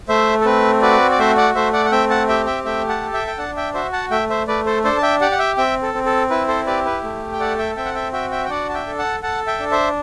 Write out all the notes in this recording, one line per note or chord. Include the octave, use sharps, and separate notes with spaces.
A3 C5 E5
A4
C4 B4
F#4 B4 D5
D5
A3 C5 E5
D5 F#5
A3 C5 E5
D5 F#5
F#5
C4 E5 G5
F#5 A5
G4 E5 G5
E5 G5
A3 E5 G5
F#5 A5
A4
E5 G5
G5
D4 F#5 A5
E5 G5
F#4 C5 E5
F#5 A5
A3 E5 G5
C5 E5
A3 B4 D5
A4 C5
D4 A4 C5
A5
E5 G5
G4 D5 F#5
F#5
E5 G5
C4 E5 G5
A4
C4
A4
E4 B4
A4 C5
G4 B4 D5
B4
A3
G5
A4 D5 F#5
E5 G5
C4 E5 G5
F#5
E5 G5
F#4 E5 G5
E5 G5
G5
D4 D5 F#5
A5
E5 G5
A4
F#5 A5
A4 F#5 A5
E5 G5
D4
C5 E5